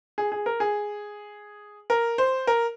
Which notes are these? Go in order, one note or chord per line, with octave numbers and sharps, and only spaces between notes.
G#4
G#4
A#4
G#4
A#4
C5
A#4